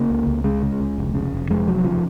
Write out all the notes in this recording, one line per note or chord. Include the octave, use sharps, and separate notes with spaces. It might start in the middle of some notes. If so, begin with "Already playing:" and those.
Already playing: C#3 A#3
C#2
C#2
C#3 G#3
C#3
C#2
F1
C#3
F1
F2 G#3
F1 F#3
C#3 F3